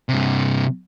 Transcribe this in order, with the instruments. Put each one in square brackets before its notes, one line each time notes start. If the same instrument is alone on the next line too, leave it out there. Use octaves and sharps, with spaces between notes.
[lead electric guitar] G2 C3